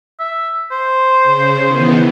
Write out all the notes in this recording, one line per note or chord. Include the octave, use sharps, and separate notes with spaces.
E5
C5
C#3
D#3 E3 B3